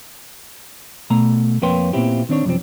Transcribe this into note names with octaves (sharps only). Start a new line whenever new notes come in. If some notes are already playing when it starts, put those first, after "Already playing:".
B2 A3 A#5
F2 A#3 B4 C#5 G5 C6
A#2 B3 C4 E4 G4
D#3 C4 D4 C#5
F#2 C3 E3 F3 C4